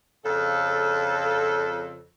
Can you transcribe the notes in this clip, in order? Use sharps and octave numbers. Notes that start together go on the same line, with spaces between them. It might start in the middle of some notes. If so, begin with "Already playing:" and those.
F2 C#3 A4